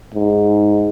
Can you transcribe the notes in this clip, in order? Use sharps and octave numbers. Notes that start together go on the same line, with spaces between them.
G#2